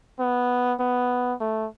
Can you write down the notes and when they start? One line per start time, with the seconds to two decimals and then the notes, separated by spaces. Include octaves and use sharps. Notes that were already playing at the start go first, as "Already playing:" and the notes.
0.19 B3
0.80 B3
1.40 A3